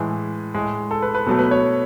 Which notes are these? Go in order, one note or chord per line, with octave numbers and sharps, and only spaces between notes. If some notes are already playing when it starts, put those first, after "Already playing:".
Already playing: A2 E3 G#3 B4
A2 G#3
A4
B4
B4
B2 F#3 A3 A4
B4
C#5